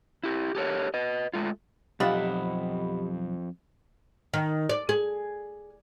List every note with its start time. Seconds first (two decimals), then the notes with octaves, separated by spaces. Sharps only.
0.23 E4 G4
0.55 G4 A4 A#4 C#5
0.94 B4 D#5
1.33 G#3 A3 F4
2.00 B1 F2 F4 G4 D#5 E5 F#5 B5
4.34 D#3
4.69 D5
4.89 G#4